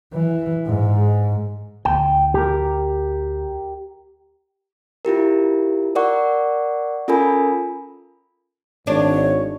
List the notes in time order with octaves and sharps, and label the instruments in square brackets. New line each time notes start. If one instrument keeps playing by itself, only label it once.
[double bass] E3
G#2
[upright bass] D2 [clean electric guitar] G5
[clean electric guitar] G4 A#4
[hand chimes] E4 F4 G4 A#4
A#4 D5 F#5 C#6
C#4 F4 A4 A#4 G#5 B5
[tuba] G#1 [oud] D4 [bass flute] C#5